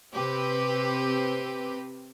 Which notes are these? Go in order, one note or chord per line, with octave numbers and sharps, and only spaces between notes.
C3 C4 G4 B4